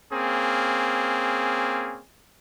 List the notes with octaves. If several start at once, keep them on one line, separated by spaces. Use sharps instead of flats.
A#3 C4 C#4 G#4